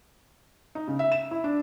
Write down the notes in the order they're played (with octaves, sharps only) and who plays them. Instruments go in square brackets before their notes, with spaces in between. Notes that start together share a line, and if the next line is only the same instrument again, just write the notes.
[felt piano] D#4
C#3
E5
E7
E4
D4